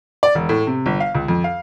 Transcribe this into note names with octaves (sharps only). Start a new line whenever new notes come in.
D5
E1
A2
C3
G1
F5
C#2
F2
F5